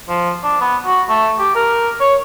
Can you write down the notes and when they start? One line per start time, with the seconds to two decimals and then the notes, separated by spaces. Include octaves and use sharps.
0.09 F3
0.43 D4
0.61 B3
0.86 F#4
1.09 A3
1.39 G4
1.55 A#4
2.00 C#5